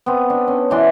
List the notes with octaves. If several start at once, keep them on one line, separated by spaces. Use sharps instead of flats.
B3 C4
D4
C#4
B2 E3 D4 C6